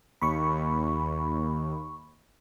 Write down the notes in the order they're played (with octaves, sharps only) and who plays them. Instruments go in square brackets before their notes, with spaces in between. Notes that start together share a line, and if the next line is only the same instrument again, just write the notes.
[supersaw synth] D#2 [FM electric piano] B5 C#6